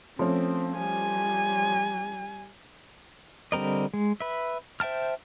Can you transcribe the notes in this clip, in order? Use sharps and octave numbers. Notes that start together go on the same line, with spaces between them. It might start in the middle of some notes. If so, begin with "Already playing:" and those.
F3 A3 C4 C#4
G3 G#5
D3 G3 C4 A#4 D#5
G#3
B4 E5
C5 E5 G5 A5 F6